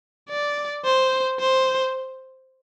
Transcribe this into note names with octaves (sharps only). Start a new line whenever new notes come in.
D5
C5
C5